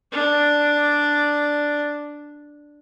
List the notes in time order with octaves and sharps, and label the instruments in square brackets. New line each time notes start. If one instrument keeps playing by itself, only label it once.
[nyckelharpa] D4 D5